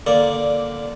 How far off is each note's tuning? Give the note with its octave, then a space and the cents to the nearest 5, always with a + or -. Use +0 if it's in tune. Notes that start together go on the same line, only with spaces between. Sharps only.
D3 +0 A#3 +0 D5 -10